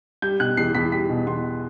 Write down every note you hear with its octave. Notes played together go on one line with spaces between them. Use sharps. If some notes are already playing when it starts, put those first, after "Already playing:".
G3 G6
B2 F#6
E2 C7
E2 B6
G3 B6
B2
E2 C6